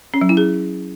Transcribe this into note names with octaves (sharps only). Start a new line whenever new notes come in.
C#4
F#3
E4
G#4